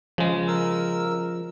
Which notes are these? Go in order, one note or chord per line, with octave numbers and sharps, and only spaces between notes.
C#3 F3 G#3
A#4 E6